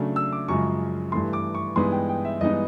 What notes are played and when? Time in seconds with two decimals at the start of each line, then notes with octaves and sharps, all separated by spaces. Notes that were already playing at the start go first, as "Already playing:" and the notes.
Already playing: C#3 F#3 A3 D4
0.16 E6
0.32 D6
0.49 F#2 C#3 F3 G#3 C#6
1.12 G2 E3 A3 C6
1.33 D6
1.55 C#6
1.76 G2 E3 G#3 B3 D#4 C6
1.92 G5
2.09 G5
2.25 E5
2.41 G2 E3 G#3 B3 D#4 D#5